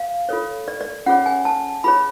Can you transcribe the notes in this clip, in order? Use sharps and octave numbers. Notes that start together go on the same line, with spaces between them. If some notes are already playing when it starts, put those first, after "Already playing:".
Already playing: F5
F4 A4 C#5
D5
D5
C#4 F4 G#4 C#5 F#5
G#5
A5
F4 G#4 C#5 B5